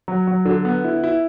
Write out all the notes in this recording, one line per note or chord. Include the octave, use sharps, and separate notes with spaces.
F#3
F#3
D3
B3
E4
E4